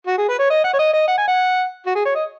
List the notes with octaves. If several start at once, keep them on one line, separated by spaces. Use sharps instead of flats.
F#4
G#4
B4
C#5
D#5
F#5
C#5
D#5
D#5
F#5
G#5
F#5
F#4
G#4
C#5
D#5